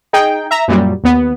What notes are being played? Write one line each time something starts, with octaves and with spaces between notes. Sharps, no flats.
D#4 G#4 G5
E5 A#5
F#2 A#2 F#3 G3
D#2 B3